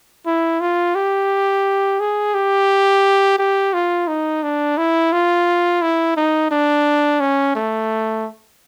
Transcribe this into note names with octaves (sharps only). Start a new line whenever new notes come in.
E4
F4
G4
G#4
G4
G4
F4
D#4
D4
E4
F4
E4
D#4
D4
C#4
A3